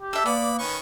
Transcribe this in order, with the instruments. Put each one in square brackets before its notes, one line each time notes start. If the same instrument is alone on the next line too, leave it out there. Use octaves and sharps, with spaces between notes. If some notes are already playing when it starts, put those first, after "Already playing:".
[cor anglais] G4
[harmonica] D4 [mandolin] A4 E5
[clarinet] A#3 [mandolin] B3 [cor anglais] D5 [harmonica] B5 D6
[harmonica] D#3 C#4 C#6 [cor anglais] B4